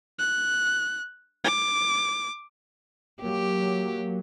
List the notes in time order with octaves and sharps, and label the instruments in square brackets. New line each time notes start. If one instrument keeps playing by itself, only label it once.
[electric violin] F#6
D6
[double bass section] F#3 [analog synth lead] A#3 [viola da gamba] G4